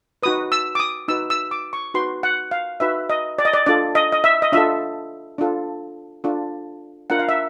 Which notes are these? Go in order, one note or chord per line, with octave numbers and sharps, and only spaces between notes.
D#4 F#4 B4 D#6
E6
D6
D#6
D#4 F#4 B4 E6
E6
D6
C#6
D#4 F#4 B4 C6
F#5
F5
D#4 F#4 B4 E5
D#5
D5
D#5
D5
D4 F4 A4 D5
D#5
D#5
E5
D#5
D4 F4 A4 E5
D4 F4 A4
D4 F4 A4
D4 F4 A#4 F#5
F5
E5